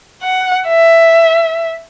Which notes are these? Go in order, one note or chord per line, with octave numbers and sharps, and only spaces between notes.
F#5
E5